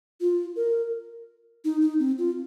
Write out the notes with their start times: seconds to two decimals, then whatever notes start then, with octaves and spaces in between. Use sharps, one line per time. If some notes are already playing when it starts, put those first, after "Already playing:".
0.21 F4
0.56 A#4
1.65 D#4
1.81 D#4
1.99 C4
2.18 F4